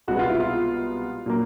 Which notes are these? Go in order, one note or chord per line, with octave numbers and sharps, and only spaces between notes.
C2 B2 G#3 B3 F#4
F4
E4
F4
A#2 F#3 A#3